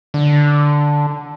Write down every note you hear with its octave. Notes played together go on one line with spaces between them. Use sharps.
D3